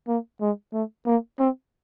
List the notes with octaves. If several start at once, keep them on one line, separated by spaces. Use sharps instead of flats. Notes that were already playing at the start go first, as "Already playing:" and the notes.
A#3
G#3
A3
A#3
C4